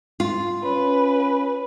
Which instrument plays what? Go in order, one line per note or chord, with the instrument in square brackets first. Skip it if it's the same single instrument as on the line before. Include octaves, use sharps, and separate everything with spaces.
[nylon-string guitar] F4
[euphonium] C#4 [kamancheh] B4